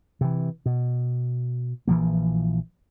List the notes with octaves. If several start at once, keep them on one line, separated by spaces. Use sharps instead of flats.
C3 E3
B2
A#1 E3 F3 A#3